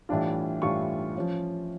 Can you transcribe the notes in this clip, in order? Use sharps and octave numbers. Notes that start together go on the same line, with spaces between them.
A2 E3 G3 D4 F4
A2 E3 G3 D4 F4 C#6
F3 C#4 F4